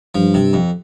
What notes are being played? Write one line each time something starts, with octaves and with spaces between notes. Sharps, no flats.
G2 F3
C3
F2